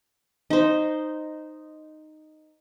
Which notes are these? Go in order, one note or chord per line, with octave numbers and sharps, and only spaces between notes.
D#4 C5